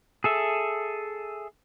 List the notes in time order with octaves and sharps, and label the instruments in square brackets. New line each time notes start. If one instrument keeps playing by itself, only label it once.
[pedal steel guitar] G#4 A4 E5